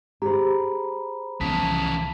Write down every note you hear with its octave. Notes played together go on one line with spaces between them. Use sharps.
G4 G#4 C5 A#5 B5
C2 C#3 E3 F3 B3 A5 B6